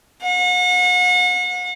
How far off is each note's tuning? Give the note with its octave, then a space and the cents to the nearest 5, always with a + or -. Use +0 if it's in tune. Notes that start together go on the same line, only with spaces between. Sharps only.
F#5 -40